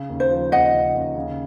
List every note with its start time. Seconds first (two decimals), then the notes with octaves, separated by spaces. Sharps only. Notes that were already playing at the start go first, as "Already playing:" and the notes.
Already playing: C#3
0.09 D#2
0.20 C5
0.30 F3
0.52 D#2 D#5 F#5
0.72 C#3
0.94 D#2
1.15 C#3